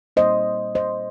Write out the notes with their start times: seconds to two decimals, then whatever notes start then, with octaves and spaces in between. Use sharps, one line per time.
0.16 A#2 G3 A#3 C5 D#5
0.75 C5 D#5